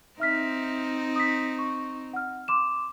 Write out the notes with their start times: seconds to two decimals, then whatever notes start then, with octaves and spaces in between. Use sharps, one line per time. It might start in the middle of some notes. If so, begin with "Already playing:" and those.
0.20 C4 D#4 E5 F6 B6
1.16 D#6 B6
1.58 C#6
2.14 F#5 F6
2.48 C6 D6 E7